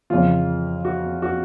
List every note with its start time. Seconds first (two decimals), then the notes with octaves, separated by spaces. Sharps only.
0.10 F2 C#3 E3 F4
0.85 F#4
1.22 F#4